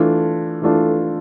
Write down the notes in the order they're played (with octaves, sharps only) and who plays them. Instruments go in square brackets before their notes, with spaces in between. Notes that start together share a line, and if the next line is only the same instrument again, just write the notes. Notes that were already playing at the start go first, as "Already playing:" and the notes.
Already playing: [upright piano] E3 A3 D4 F4
E3 A3 D4 F4